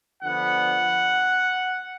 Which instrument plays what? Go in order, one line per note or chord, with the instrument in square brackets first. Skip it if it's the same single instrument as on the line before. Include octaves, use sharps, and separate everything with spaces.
[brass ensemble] D3 F3 B3 D4 F#5